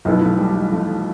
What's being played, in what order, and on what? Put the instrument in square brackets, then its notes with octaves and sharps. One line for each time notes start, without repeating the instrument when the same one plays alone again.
[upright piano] B1 B2 B3 E4 [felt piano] F3
[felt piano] F3 A3
E3 G3
E3 G3
F3 A3